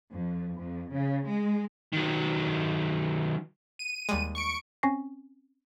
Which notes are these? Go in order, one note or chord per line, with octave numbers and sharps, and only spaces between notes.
F2
F2
C#3
G#3
D#3 F#3
D#7
D#2 G3 G#3
C#6 C#7 D7
C4 C#4 G#5 C#6 A#6 C7